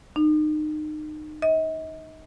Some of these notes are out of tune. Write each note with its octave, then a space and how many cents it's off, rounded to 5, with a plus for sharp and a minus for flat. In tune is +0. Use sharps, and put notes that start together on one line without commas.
D#4 -30
D#5 +40